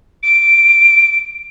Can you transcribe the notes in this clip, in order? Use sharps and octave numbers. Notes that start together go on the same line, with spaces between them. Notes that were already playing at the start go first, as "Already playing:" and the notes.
D7